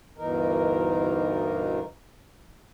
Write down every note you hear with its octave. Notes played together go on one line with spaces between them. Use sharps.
D2 G2 B2 E3 D#4 A#4